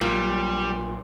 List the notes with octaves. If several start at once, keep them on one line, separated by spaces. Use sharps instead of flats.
A#1 A#2 F#3 G3